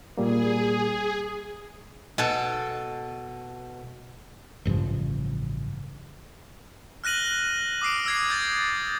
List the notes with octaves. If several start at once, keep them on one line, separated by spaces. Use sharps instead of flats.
A#2 G3 A#3 G#4
B2 A4
A1 G2 C#3 F3
F6 F#6 A#6 D#7 F#7
D6 D#6 C7 D7
E6 G#6 C7
G6 A6